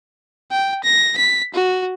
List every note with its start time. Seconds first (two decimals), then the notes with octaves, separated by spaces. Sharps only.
0.51 G5
0.84 A#6
1.17 B6
1.54 F#4